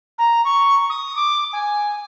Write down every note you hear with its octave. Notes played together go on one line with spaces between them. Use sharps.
A#5
C#6
D#6
D6
G#5